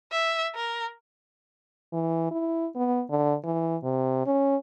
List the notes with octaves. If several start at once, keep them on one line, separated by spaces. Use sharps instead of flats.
E5
A#4
E3
E4
B3
D3
E3
C3
C#4